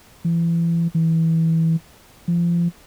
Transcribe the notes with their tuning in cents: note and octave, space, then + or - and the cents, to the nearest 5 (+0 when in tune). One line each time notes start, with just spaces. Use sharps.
E3 +30
E3 -20
F3 -30